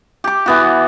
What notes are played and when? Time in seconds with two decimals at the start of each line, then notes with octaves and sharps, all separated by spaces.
0.24 G4 D6
0.46 E3 B3 F#4